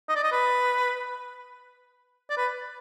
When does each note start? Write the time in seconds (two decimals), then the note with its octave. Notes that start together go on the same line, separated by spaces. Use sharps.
0.09 D#5
0.16 D5
0.23 D#5
0.32 B4
2.30 D5
2.37 B4